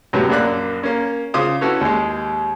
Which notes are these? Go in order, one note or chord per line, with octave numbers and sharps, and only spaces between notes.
F#2 A2 C3 F#3 B3 F#4
A#1 F#2 A#3 D5 F#6
A#3 C#4
C#3 F4 C5 D6 D#6
C#4 E4 F#4 A4 B4 C#5
D#2 G#3